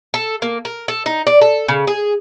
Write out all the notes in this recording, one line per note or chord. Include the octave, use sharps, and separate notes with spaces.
A4
A#3
A#4
A4
D#4
D5
A4
C#3
G#4